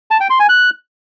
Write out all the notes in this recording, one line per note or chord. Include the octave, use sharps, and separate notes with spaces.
A5
G5
C6
G#5
F#6